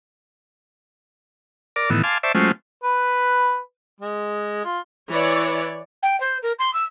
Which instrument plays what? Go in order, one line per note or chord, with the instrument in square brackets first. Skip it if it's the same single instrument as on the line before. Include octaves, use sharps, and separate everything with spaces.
[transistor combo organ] A#4 D5 D6
A2 D#3 E3 B3
F5 G#5 A5 C6 D6
C5 D5 E5 A5 C#6
F#3 G#3 A3 C#4 F4 C5
[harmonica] B4
G#3
F4
[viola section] E3 C#5 D5
[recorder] G5
C5
A#4
C6
E6